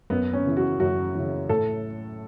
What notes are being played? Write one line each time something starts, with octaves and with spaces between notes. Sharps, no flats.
F#2 B3
C#4
C#3 E3
F#4
F#2 F#4
C#3 E3
A2 A4